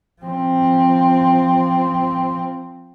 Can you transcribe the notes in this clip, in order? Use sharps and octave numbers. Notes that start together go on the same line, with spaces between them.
F3 C4